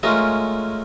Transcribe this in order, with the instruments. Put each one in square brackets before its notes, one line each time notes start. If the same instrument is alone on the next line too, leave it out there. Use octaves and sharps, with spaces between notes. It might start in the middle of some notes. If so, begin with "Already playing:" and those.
[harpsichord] G#3 A3 C#4 F4 A#4 D#5